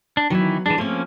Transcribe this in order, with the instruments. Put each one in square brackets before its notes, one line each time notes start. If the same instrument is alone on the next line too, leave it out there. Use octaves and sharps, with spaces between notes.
[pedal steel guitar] D4
[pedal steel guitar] D#3 E3 E4 [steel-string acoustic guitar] F#3 B3
[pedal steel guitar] E3 D4 [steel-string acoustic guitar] G#3
[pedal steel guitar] F3 A#3 C#4 [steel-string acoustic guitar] A3 C4